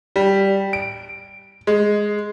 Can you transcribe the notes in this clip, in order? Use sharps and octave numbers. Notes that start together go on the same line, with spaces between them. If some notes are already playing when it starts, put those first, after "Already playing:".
G3
D7
G#3